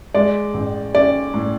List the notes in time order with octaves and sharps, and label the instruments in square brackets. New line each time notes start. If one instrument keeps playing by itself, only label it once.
[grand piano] G#3 [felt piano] D5
[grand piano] A1
[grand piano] C#4 [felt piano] D5
[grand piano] A2